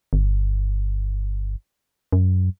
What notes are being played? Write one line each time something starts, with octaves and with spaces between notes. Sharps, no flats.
G1
F#2